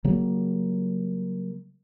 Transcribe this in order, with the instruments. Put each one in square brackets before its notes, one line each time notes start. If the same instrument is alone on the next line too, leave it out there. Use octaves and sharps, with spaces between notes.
[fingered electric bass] C#3 F#3 G3 A#3